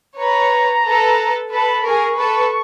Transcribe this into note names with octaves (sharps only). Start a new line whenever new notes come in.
B4 C#5 A#5
A4 B4
A4 B4 B5
G#4 A#4 C#6
A4 B4